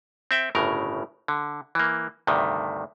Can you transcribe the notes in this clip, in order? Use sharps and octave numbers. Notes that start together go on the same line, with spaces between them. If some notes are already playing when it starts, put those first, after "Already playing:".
C4 E5 G5
G1 A2 C#3 A#4
D3
E3 A#3
D2 G2 C3 D#3